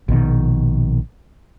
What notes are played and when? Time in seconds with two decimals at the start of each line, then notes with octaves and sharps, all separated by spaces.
0.08 A#1 B2 D#3